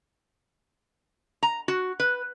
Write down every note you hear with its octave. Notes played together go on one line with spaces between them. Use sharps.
A#5
F#4
B4